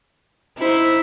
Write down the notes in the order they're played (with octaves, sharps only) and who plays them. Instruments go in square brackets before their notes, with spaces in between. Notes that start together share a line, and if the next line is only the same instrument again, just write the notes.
[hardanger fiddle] D#4 C5 [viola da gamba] E4